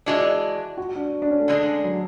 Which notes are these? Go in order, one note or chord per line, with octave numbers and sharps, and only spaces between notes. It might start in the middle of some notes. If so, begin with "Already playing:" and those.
E3 G#3 D4 F#4
F#4
D4
D4
C#4
A3
D3 G#3 D4 G#4
F#3